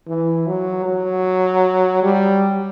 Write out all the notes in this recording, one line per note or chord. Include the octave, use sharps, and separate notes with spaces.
E3
F#3
F#3
G3